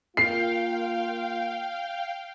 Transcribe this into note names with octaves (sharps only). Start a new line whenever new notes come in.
A#3 F4 F5 G5 C7